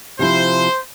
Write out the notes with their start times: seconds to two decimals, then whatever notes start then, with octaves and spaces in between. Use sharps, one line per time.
0.19 C3 F3 E4 C5